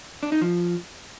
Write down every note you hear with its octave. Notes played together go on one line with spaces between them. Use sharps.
D4
D#4
F3